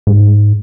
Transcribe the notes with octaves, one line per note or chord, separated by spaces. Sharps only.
G#2